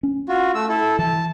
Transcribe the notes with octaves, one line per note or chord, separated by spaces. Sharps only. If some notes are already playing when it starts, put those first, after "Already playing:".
C#4
F4 F#4
A3 E6
E4 A4
E3 A5